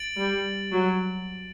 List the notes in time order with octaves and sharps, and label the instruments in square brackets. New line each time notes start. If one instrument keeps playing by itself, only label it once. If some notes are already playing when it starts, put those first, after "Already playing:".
Already playing: [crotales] A6 D7 F#7
[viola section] G3
F#3